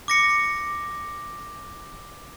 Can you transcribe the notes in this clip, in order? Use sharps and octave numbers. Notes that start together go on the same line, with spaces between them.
D6 A#6 C#7